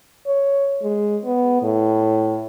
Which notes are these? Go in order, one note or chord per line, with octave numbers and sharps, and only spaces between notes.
C#5
G#3
B3
A2